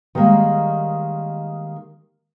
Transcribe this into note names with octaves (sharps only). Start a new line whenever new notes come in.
D#3 G3 G#3 A#3